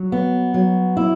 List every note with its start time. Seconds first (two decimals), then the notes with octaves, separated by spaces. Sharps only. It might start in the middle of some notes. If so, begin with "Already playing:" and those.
Already playing: F#3
0.12 B3
0.54 F#3
0.97 E4